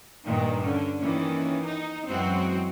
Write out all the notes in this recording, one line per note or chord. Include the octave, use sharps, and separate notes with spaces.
G2 A#2 D#3
D3 C#4
D#3 E3 A#3 C#4
D#4
F#2 E3 F#3 G#3 C4 F#4